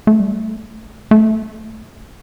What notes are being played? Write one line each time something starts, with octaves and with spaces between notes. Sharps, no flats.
A3
G3
A3
A3